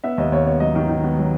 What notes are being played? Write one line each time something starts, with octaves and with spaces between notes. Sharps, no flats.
B3 E5
D#2 D#5
D#2 C#5
B3 C#5
F#3 D#5
D#3
D#3
B3
F#3